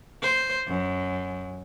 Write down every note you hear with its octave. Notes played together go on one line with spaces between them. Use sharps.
C5
F#2